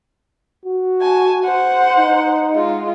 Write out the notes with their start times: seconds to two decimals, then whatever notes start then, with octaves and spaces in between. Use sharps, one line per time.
0.66 F#4
1.02 G#5 A5
1.44 C5 F#5
1.98 D#4
2.53 G#3 F4